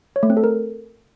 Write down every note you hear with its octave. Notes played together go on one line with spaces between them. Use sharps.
C#5
A3
C4
A4
A#4